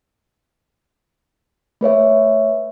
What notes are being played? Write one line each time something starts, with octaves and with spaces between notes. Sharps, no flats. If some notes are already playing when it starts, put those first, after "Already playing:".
A3 B4 C#5 E5